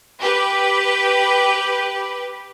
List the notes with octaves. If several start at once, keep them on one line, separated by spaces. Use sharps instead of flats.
G4 B4